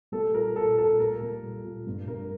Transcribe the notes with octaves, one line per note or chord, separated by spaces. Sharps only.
G3 A4
A#2 A#4
A#2 A4
A#2 A4
A#3 A#4
G3
A#2
A#2
G2
G2 A#4